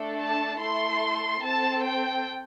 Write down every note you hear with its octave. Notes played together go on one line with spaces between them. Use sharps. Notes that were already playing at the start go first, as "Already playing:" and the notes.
Already playing: A3 D4 A4
A5
A3 E4 A4 C6
C4 A4 A5
G5